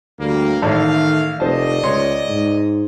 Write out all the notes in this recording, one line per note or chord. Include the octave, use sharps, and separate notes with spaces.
D2 G3 A#3
A1 D#3 A3 F5
F1 C2 C5 D5 D#5 A5
C#2 C#5 C6
G#2